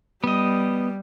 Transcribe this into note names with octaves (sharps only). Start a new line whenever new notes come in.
G3 B3 D#5